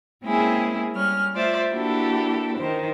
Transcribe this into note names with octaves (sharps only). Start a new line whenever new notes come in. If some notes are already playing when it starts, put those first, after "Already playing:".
G#3 A#3 C4 C#4 E4 G#4
G3 C#4 F6
A3 F4 C5 D5 E5
A#3 D4 E4 F#4 G4 A4
D#3 C5